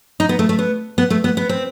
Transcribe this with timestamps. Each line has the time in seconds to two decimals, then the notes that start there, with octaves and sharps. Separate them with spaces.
0.20 D#4
0.29 B3
0.39 A3
0.49 A3
0.59 B3
0.98 B3
1.10 A3
1.24 B3
1.37 B3
1.49 C4